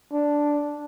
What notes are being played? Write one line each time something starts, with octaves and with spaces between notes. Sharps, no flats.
D4